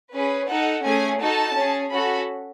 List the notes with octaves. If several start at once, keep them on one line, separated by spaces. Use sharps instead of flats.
C#4 G#4 B4
D#4 A4 F#5
A3 C#4 G#4 G#5
D#4 F#4 A4 A5
C#4 G#4
C#4 F#4 A4 B5